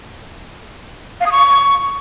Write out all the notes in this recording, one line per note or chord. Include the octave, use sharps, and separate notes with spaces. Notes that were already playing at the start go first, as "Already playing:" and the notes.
F5
D#6
C#6